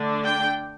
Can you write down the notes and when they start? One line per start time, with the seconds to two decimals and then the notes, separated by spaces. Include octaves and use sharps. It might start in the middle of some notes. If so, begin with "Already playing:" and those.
Already playing: D3 A3 D4
0.25 G5